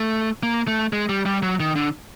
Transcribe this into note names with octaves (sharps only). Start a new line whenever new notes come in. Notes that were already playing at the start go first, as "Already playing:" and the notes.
Already playing: A3
A#3
A3
G#3
G3
G3
F#3
D#3
D3